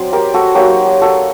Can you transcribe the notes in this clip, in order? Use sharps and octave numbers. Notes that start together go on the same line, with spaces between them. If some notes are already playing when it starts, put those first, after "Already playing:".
Already playing: F#3 C4 C5 D5
G4 A#4
F#4 A4
F#3 A#3 D#4 G4
G4
F#4 A4